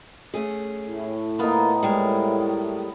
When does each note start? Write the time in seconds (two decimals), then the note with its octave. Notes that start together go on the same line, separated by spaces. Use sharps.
0.34 A3 C#4 G#4
0.86 A2
1.39 A#3 B3 D#4 F4
1.83 G3 G#3 A#4